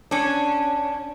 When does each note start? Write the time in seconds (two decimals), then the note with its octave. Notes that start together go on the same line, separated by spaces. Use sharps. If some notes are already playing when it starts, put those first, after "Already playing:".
0.11 C#4 D4